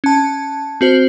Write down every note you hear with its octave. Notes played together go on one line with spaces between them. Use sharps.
C#4 A5
C4 F#4 C5